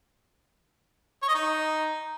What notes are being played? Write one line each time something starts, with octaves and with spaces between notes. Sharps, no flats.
C#5
D#5
D#4